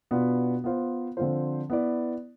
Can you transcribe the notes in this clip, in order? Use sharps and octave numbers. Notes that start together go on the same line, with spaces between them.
B2 B3 D4 F4 B4
B3 F4 C5
D3 F3 C4 F4 C5
B3 E4 B4 D5